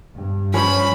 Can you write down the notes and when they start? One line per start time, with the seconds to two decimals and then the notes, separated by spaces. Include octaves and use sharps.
0.17 G2
0.54 F3 C#4 B4 G#5 B5